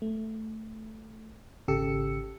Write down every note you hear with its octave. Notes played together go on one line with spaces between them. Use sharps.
A3
G#1 C#3 G4 A4 E6 C#7